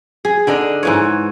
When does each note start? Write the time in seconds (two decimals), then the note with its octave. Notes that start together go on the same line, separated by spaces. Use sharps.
0.25 G#4
0.47 D3 D4 D#4 D#5
0.83 G#2 E3 C#5